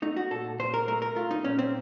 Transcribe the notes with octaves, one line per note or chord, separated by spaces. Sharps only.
A3 D#4
F#4
A#2 A4
A#2 C5
A#4
A3 A#4
A#4
A3 F4
D#4
A#2 C#4
C4